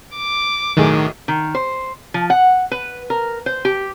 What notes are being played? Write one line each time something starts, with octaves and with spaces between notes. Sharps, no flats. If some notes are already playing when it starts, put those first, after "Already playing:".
D6
B1 A2 D#3 G#4
D#3
C5
F3
F#5
B4
A#4
C5
G4